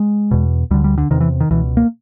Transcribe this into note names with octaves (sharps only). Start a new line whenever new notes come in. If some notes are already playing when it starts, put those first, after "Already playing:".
Already playing: G#3
E2 B2
D2 D3 G3
G3
D3
E2 C3 D#3
E3
D#3
C#2 B2 E3
A#3